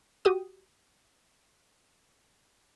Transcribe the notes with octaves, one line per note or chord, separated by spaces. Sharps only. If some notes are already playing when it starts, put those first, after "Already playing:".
F#4 G4 D#6